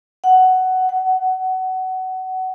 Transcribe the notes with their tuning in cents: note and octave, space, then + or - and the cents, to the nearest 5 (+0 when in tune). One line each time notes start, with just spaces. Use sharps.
F#5 +10
F#5 +20